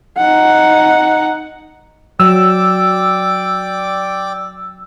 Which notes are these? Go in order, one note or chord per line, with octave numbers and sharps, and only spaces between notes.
D#4 F#5
F#3 D5 G5 D6 E6